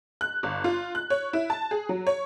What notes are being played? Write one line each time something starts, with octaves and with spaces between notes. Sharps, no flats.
F#6
G1
F4
F#6
C#5
E4
A5
G#4
F#3
C#5